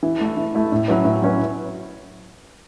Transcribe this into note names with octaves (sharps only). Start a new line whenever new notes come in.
E3
A3 E4
E3
A3 E4
A2
F#3 C#4 E4 B4
A2
F#3 C#4 E4 B4